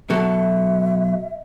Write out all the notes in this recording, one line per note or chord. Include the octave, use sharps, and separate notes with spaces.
B2 F#3 A4 E5